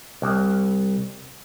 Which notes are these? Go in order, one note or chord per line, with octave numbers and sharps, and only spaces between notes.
C2